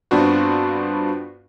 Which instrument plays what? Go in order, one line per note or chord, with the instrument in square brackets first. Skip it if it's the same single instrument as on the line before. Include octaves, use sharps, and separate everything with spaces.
[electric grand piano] G2 B3 C4 D4 F4 F#4